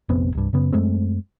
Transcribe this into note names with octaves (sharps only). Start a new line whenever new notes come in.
F1 A#1 B3 C4
C2 G2
F#2 C#3 B3
F#2 G#3 A3 C4